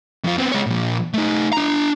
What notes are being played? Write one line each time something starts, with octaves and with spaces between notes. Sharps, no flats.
F2 F4
B3 C4
G#3 C#5
A#2 F3
A3 D#4
D4 A#5